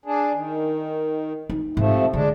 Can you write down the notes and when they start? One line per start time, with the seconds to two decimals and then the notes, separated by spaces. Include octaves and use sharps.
0.06 D4 G#4
0.33 D#3
1.50 D#4
1.77 G#2 C3 F3 A3
2.13 D3 G#3 D4